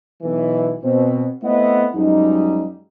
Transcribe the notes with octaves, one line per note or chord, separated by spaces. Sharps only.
B1 E3
B2 C4
A3 B3 C4 E4 D#5 F#5
F#2 F3 G3 G#3 D#4